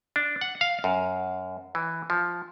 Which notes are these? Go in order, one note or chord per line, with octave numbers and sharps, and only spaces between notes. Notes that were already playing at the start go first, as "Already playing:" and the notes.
D4
F#5
F5
F#2
E3
F3